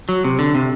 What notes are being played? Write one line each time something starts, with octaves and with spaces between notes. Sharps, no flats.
F#3
C3
D3
C3